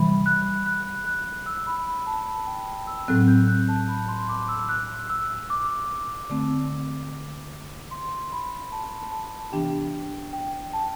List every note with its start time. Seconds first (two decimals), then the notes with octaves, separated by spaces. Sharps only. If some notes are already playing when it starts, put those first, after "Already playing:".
Already playing: C3 E3 G3 B5
0.26 F#6
0.66 F#6
1.07 F#6
1.46 E6
1.67 B5
1.87 B5
2.07 A5
2.27 A5
2.47 G5
2.67 G5
2.87 E6
3.08 A2 F#3 C4 F#6
3.27 G6
3.48 F#6
3.68 A5
3.88 B5
4.08 C6
4.29 D6
4.48 E6
4.69 F#6
5.09 E6
5.50 D6
6.30 D3 A3 C4
7.91 C6
8.32 B5
8.72 A5
9.12 A5
9.52 C3 E3 B3 D4 G4 G5
10.33 G5
10.73 A5